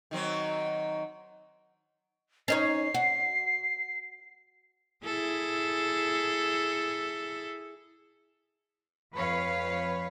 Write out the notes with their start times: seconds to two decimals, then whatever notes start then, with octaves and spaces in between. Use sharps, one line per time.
0.11 D#3 F#3 C4
2.48 C#4 D#4 C#5 C7
2.94 F#4
5.05 E4 G#4 A4
9.14 F2 B4 C#5 F5